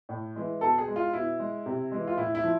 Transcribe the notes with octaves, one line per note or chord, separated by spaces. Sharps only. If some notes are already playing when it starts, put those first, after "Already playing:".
A2
E3 G#3
B2 A4
G#4
G#3
F4
B2 E4
G#3
C3
E3 G#3
F4
A2 E4
E4
F3